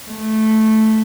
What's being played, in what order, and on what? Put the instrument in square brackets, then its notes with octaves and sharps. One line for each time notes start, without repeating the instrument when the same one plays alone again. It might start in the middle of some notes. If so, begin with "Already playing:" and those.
[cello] A3